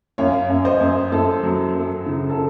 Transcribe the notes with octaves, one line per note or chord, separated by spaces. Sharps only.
F#2 C#5 F5
F#2
C5 D#5
F#2
F#2 A4
F#3
F#2
C#3
A4